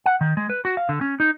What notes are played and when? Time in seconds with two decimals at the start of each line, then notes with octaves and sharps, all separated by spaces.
0.06 F#5
0.21 D#3
0.37 G#3
0.50 B4
0.65 F#4
0.77 F5
0.89 D3
1.01 C#4
1.20 D#4